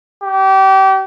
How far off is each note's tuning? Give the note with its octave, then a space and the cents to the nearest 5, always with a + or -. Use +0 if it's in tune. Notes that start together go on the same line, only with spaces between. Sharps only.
G4 -30